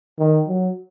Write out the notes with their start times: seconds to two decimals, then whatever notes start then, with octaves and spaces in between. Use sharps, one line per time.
0.19 D#3
0.48 F#3